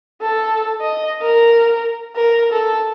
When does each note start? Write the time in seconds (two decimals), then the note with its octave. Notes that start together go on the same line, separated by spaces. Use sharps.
0.22 A4
0.81 D#5
1.22 A#4
2.16 A#4
2.52 A4